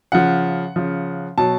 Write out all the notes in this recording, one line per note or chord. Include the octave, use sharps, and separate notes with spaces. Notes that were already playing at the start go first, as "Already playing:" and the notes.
C#3 F3 F#5
C#3 F3
B2 F#3 A5